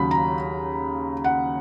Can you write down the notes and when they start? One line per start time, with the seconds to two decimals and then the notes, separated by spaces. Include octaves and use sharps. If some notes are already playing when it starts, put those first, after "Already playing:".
Already playing: D#2 C#3 F#3 B5
0.11 A#5
1.24 F#5